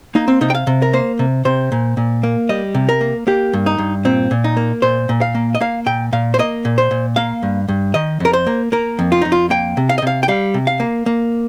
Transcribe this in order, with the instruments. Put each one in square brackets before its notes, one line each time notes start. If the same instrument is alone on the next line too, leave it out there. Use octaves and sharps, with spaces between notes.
[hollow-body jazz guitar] A#3 D#4
C4
C3 D#4
G5
F5
C3
A#4
A#3 C5
C3
C3 C5
A#2
A#2
A#3
G3 D#5
C3
A#4
A#3
A#3 G4
G2
D#4
G2
A#2 C4
A#2
D#4
A#3
A#2 C5
A#2
F5
A#3
D#5
A#3 F5
A#2 G5
A#2 F5
C5
A#3 D#5
A#2
C5
A#2
A#3 F5
G2
G2
D#3 D#5
F2 A#4
C5
A#3
A#3 A#4
F2
F4
F2 D#4
F4
A#3 G5
C3
F5
D#5
C3 F5
G5
G3 F5
C3
F5
A#3
A#3